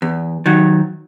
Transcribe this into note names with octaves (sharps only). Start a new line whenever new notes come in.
E2
D#3 F#3